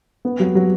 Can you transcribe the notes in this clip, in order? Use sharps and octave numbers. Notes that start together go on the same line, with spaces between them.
B3
F#3
F#3